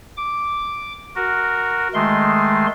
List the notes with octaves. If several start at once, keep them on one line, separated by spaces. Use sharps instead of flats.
D6
F#4 A#4
D#3 G#3 A3 C6